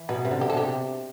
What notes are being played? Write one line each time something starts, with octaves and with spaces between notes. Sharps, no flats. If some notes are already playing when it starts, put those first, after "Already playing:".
Already playing: E3
B2 B4
C3 B4
D3
G4
A4
C3 G4